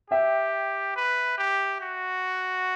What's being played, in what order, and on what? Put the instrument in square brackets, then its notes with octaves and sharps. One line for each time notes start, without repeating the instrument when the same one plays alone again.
[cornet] G4 [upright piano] E5 G5
[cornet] B4
G4
F#4